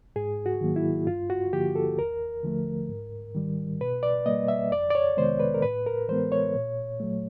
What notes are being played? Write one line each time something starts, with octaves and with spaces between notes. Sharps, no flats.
G#2 G#4
F#4
D#3 F#3 A#3
E4
G2 F4
F#4
D3 F3 A#3 G4
A4
D#2 A#4
D3 F3 A3
G#2
D#3 G3
B2 B4
D5
G3 A#3 D#5
E5
F2 D5
D5
C#5
C3 D#3 G#3 B3 C5
B4
A#4
A2 B4
A#4
E3 G#3 B3 C5
C#5
A#2
F#3 A3